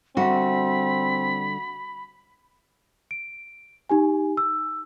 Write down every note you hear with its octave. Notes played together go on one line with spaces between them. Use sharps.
D3 G3 C4 F#4 E5 B5
D7
D#4 G4 G#5
E6